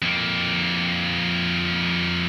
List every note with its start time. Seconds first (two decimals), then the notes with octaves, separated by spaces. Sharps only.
0.02 F2 A#3